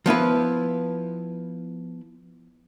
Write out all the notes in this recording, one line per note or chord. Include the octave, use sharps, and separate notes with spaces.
F3 B3 E4 B4